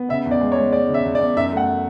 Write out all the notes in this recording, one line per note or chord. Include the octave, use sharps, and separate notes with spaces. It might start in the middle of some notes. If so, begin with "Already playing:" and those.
Already playing: B3
C#3 E5
E2
D5
G#3
C#5
G#3
G#3 D5
C#3
E5
E2
D5
E2
F#2 E5
A3 F#5